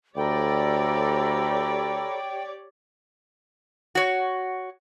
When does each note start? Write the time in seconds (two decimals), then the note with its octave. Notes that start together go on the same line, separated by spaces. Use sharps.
0.17 D2 G4 A4 A#4 C#5 D5 G5 B5
3.95 F#4 C#5